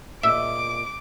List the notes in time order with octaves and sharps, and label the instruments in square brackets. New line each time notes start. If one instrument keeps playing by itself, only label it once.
[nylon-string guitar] A#2 G#4 D#5 [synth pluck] E5 [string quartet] D6 [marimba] E6